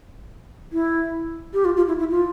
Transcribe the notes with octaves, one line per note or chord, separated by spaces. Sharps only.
E4
G4
F4
F4
E4
E4
F4